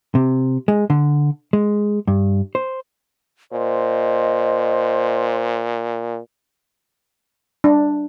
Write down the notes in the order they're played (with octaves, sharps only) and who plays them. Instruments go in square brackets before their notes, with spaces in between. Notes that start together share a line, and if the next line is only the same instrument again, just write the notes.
[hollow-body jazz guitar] C3
G#3
D3
G#3
G2
C5
[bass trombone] A#2 [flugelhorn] C5 [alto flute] D#5
[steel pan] D4